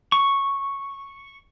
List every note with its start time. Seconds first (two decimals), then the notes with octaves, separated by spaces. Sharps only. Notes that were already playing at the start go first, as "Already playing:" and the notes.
0.12 C#6